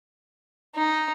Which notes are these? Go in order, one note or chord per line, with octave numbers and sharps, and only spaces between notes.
D#4